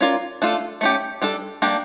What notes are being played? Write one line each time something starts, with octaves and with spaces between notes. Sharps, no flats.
C#4 F4 A#4 D5
A3 D4 F4 A4
A3 C#4 G4
G3 D4 A4
G3 A#3 D4 G4